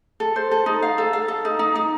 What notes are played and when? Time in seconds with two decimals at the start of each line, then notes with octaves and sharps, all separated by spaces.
0.20 A4
0.36 C5
0.51 A4
0.66 D#4
0.82 F5
0.98 A4
1.13 F5
1.28 A4
1.45 D#4
1.59 D#4
1.75 D#4